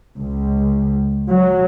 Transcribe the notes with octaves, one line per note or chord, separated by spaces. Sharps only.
C#2
F#3